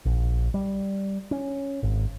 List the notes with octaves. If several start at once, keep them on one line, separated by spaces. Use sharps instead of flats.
A#1
G3
C#4
G#1